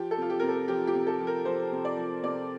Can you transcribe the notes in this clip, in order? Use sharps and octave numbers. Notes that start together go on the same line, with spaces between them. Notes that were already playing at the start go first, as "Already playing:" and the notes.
Already playing: F3 G4
A4
C3 F4
G4
C3 A#4
A4
F3 G4
G4
C3
A4
F3
A#4
F3 C5
C3
D5
F3
C3 D5